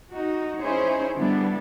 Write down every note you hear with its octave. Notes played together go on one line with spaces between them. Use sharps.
D#4 F#4
C#4 D#4 E4 G#4 C5 C#5
D3 G3 B3 D4 E4